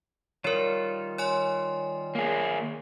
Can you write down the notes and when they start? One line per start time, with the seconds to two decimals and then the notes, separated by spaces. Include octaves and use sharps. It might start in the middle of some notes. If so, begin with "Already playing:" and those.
0.44 D#3 G3 F4 A#4 C#5
1.18 C#5 G#5 C6
2.15 A#3 G#4